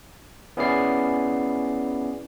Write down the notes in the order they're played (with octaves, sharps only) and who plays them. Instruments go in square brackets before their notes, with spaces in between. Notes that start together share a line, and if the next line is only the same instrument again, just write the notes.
[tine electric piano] B3 C#4 E4 G#4 D5 C7